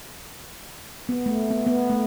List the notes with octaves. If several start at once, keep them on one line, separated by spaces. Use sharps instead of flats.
B3
A3
B3
B3
A3